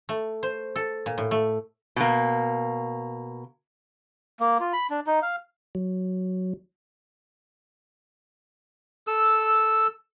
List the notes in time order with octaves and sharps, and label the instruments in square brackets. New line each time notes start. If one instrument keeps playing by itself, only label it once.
[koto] A3
C5
A4
A#2
A2
A3
[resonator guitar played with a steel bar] B2 A#3
[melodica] A#3
F4
B5
D4
D#4
F5
[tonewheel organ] F#3
[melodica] A4 E6